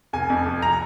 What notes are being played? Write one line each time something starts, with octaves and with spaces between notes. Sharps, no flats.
F1 G#5
F2
F1
A#5